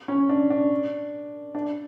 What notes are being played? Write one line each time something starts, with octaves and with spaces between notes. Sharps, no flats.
C#4
D4
D4
D4